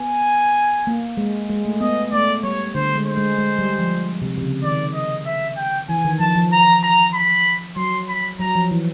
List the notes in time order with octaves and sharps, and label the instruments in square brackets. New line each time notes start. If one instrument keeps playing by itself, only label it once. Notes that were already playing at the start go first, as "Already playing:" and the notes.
Already playing: [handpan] B3 [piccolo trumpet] G#5
[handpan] A#3
G#3
G#3
A3
[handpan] B3 [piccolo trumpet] D#5
[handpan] A3 [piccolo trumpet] D5
[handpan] G3 [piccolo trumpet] C#5
[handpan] D3 [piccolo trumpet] C5
[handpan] G#3
[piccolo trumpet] C5
[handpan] G#3
G#3
G3
F3
C3
C3
C#3
[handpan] D#3 [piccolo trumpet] D5
[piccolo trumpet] D#5
E5
G5
[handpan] E3 [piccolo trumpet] G#5
[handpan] D#3
[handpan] F3 [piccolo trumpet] A5
[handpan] F3
[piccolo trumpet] A#5
A#5
B5
[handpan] F#3 [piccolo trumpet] C6
[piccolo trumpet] B5
[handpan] F#3 [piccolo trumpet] A#5
[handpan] F3
E3